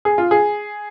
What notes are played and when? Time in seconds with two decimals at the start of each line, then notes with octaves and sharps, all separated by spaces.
0.05 G#4
0.18 F4
0.31 G#4